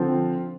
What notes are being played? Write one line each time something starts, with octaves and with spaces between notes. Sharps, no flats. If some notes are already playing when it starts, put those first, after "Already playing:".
Already playing: D3 F3 C4 F4 A4